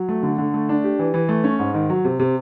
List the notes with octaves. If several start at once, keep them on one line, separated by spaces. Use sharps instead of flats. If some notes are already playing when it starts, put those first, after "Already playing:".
Already playing: F#3
A3
D3
D3
A3
D4
G4
E3
E3
A3
C#4
G#2
D#3
F#3
C3
C3